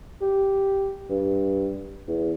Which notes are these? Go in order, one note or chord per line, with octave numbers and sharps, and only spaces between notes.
G4
G2
E2